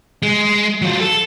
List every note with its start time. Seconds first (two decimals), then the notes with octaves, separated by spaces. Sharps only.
0.22 G#3
0.82 F#3 F4
1.00 A4